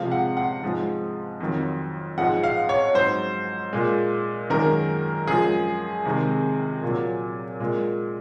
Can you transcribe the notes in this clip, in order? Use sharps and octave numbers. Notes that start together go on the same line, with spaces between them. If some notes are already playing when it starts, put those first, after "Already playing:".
Already playing: C3 F3 G#3 F5
F#5
F#5
G#2 F3 G#3
F2 D#3 F#3
G#2 F3 G#3 F#5
F5
C#5
G#2 F#3 C5
A#2 G#3
F#2 D#3 G#3 A#4
F#2 F3 G#3 G#4
C3 D#3 G#3
A#2 F#3
A#2 G#3